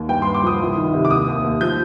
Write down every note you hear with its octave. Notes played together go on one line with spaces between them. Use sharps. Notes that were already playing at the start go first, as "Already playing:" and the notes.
Already playing: D#2
G2 G5
G2 C6
D6
F3 D#6
C2
D#3
C3
D6
D#2 D#6
D#2
D#2
F3 G6